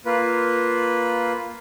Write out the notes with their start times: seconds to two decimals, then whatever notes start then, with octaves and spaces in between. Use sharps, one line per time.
0.06 A#3 F4 B4